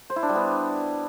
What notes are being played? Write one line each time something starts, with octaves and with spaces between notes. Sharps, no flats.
C5
E4
D4
G3
B3